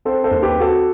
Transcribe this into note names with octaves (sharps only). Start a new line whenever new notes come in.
C4 A4 C5
A4 C5
D#2
G4 B4
C4
F#4 A4